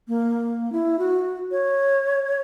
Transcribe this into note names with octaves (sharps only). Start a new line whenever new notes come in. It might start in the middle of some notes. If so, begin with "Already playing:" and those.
A#3
E4
F#4
C#5